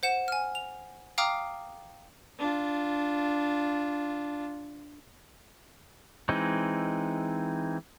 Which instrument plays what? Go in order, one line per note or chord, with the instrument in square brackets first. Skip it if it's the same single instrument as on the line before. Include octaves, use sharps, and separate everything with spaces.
[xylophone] C5 F#5 E7
G#5 F6
F7
F5 G5 A#5 D6 D#6 F6
[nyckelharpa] D4 F4
[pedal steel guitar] E3 G#3 C4 D#4